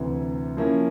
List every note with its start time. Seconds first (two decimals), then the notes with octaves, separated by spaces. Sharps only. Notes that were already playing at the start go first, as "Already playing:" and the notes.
Already playing: D2 C3 E3
0.57 F3 A#3 C#4 E4